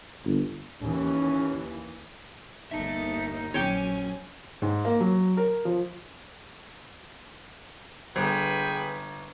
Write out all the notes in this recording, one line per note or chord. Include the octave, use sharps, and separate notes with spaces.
G1
D#2 E3 C#4
G1 D#2 D#4 E5 A5
A#1 F#3 C#4 C#5 G5 G#5 D6
G#2
A#3
F#3
A#4
F3
G1 G#4 B4 G5